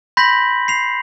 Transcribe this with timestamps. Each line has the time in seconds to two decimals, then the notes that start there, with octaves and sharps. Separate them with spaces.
0.17 B5 C6 G6 A#6 B6 F#7
0.68 C7 F7